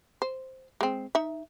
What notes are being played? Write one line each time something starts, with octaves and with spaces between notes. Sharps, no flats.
C5
G#3 C4
D#4 E5